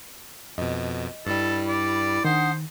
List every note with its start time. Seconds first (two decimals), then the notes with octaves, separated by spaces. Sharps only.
0.58 F2 B2 D#5
1.27 G2 G3 E4 A4
1.68 D5
2.25 D#3 D4 C5 F#5 D#6